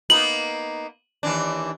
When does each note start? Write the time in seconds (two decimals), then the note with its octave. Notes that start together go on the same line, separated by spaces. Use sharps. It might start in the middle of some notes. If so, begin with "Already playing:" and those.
0.10 A#3 B3 D#4 F#7
1.23 D#2 E3 D4